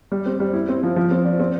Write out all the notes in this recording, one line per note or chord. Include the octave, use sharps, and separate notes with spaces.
G3
C4
G3
E4
C4
F3
F3
C4
D5
C4